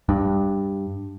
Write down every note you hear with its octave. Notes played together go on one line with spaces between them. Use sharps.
G2